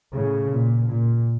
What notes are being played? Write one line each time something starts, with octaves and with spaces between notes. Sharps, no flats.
A2 C#3
A#2
A#2